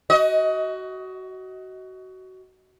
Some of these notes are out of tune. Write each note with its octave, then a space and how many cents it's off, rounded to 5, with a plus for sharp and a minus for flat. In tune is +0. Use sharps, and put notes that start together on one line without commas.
F#4 +20 D#5 +25